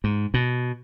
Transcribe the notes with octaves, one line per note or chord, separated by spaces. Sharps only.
G#2
B2